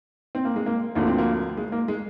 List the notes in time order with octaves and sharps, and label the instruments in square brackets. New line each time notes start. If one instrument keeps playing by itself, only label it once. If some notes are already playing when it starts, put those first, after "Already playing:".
[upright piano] C4
A#3
G#3
A#3
D2 D3 F3 A#3
C4
A#3
G#3
A#3
G#3